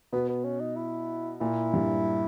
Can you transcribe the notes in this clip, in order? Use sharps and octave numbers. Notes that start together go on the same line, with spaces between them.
B2 B3
B3
C#4
D#4
E4
A#2 E4
G2